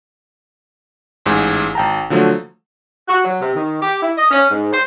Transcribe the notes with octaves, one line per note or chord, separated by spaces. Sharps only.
A1 G#2 G#4
G#1 G5 A5 A#5
D3 F3 F#3 A3
F#4
F#3
C3
D#3
G4
E4
D#5
C#4
G#2
C5